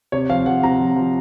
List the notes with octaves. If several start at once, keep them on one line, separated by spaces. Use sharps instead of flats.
C3 C#5
F3 F5
F3 F#5
C3 A#5
F3
F3